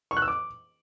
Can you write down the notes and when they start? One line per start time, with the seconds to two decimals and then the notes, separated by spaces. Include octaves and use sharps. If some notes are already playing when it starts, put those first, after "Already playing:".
0.11 C#6
0.17 F#6
0.22 E6
0.28 D6